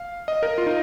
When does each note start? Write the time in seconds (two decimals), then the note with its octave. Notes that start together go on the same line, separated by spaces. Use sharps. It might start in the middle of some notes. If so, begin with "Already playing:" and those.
Already playing: F5
0.28 D#5
0.43 A#4
0.58 F4
0.66 D#4